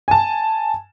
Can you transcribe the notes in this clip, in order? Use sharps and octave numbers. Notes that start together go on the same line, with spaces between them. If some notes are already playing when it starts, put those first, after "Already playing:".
G#5 A5